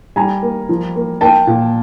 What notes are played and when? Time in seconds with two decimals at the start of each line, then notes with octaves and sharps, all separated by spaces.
0.16 G3 G#5 A#5
0.43 A#3
0.69 F3
0.96 A#3
1.21 A#3 G5 A5
1.47 A#2